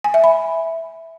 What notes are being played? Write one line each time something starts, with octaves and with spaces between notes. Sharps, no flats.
G#5
E5
B5